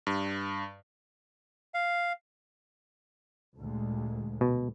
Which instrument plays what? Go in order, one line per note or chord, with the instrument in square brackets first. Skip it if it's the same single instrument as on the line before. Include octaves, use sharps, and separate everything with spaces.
[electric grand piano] G2
[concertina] F5
[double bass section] D2 A#2 G#3
[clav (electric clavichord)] B2